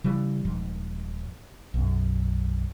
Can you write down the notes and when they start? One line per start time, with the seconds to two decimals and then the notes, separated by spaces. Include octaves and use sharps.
0.04 C#3 E3 G3
0.45 D#1 G#2 F3
1.74 B1 F#2